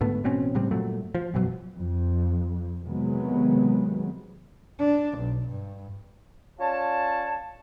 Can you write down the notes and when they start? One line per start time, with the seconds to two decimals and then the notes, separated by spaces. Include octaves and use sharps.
0.01 D2 G#2 A3 B3
0.24 A1 B2 C4 C#4
0.55 A2 C#3 G3 C4
0.71 G2 A#2 F#3 A3
1.15 F3
1.34 F1 F#2 B2 F#3
1.78 F2
2.83 C3 D#3 F#3 G#3 B3
4.79 D4
5.18 B1
5.48 G2
6.59 C#4 F4 C#5 D5 A5